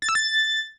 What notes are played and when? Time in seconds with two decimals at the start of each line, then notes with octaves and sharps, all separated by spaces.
0.02 A6
0.09 E6
0.15 A6